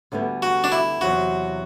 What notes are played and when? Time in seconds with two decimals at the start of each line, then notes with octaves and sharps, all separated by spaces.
0.12 D2 D3 G3 B3
0.42 F#4
0.64 D4
0.72 E4
1.01 E2 C3 F#3 F#4